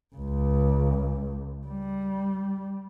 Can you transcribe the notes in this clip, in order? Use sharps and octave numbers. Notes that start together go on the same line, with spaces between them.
C#2
G3